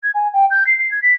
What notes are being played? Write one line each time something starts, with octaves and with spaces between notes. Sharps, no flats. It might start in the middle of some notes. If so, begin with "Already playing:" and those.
G#6
G#5
G5
G6
C7
C7
G#6
B6